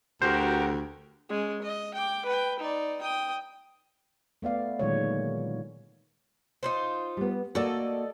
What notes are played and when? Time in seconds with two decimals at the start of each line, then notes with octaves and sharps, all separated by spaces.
0.22 D2 F#4 G4 A#4 C5
1.29 G#3 C#4
1.62 D#5
1.94 G5 D6
2.26 B4 G5
2.59 D#4 D5
3.02 G5 D#6
4.42 A3 B3 D5 F5
4.79 A#2 D3 D#3 F#3 G#3 C#5
6.63 D#4 F4 C5
7.17 G3 B3
7.55 A#3 F#4 A4 D5 D#5